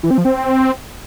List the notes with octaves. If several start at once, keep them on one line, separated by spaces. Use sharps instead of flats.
E3
C4
F3
C4